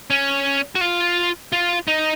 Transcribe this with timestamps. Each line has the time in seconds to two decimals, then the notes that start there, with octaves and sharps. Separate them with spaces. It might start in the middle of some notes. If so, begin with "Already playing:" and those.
0.10 C#4
0.75 F#4
0.81 F4
1.52 F4
1.88 D#4